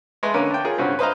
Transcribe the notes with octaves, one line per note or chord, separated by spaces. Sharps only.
G#3 A3 B4 C6
D3 A#3 B3 C#4 A#4 B4
D4 G5
F4 G#4 A#4 C#5
G2 C#3 C4 C#4 F#4
B4 C5 D#5 F5 A#5